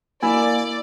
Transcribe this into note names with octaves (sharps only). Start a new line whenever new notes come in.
A#3 E4 D5 G#5